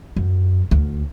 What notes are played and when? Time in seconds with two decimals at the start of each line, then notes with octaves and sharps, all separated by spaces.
0.16 F#2
0.71 D2